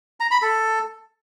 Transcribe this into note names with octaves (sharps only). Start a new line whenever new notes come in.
A#5
B5
A4